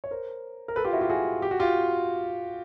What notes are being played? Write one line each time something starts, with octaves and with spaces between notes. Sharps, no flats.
C#5
A#4 C5
A#4
A4 B4
F4 G4
E4 F#4
F4 G4
F#4 G#4
G4
F#4
F4 G4